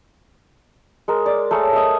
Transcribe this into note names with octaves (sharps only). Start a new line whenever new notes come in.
G#3 A#4
D5
A3 G#4 A#4 C#5
D#5 E5